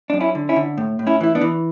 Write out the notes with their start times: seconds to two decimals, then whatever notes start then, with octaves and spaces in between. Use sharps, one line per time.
0.10 F#2 D4
0.20 C#4 E4
0.35 D3
0.49 C#4 E4
0.56 D3
0.78 A2
0.99 A2
1.07 C#4 E4
1.20 E3 E4
1.35 B3 D4
1.41 E3